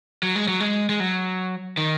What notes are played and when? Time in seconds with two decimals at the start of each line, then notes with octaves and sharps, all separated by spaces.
0.23 F#3
0.36 G#3
0.48 F#3
0.60 G#3
0.89 G#3
1.00 F#3
1.77 D#3